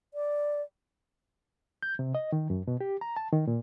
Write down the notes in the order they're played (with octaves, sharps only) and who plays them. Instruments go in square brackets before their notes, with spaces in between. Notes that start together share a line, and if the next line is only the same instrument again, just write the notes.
[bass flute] D5
[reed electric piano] G6
C3
D#5
D#3
F#2
B2
G4
A#5
A5
D#3
A#2